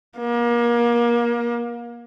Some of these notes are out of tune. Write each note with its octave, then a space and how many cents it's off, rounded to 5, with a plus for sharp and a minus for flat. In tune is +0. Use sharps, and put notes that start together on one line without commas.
A#3 +30